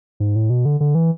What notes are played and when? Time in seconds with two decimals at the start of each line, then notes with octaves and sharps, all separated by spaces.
0.20 G#2
0.36 A2
0.50 B2
0.65 D3
0.80 D3
0.95 E3